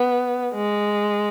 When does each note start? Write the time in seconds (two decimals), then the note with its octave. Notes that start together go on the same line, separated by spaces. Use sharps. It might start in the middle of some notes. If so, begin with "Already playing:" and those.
Already playing: B3
0.54 G#3